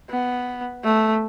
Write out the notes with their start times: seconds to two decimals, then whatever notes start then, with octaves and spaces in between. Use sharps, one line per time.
0.10 B3
0.84 A3